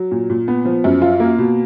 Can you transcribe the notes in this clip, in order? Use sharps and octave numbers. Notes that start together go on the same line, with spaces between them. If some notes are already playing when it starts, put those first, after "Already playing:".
Already playing: F#3
A#2
A#2
B3
F3
F#2
F4
A#3
B2